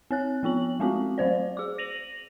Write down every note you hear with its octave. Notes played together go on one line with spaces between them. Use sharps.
C4 C#5 F#6
F3 B3 F4 F#7
G#3 A3 C4 C#4 F4 F#4
F#3 A3 C5 D5
G#4 D6
A#6 D#7 F7 F#7